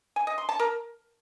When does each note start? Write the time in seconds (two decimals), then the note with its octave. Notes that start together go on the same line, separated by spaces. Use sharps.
0.16 G#5
0.27 D#5
0.38 C6
0.49 A5
0.60 A#4